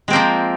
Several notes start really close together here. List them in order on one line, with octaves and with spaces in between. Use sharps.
G#3 C4 A#3 F3